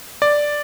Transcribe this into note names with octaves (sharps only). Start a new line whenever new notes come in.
D5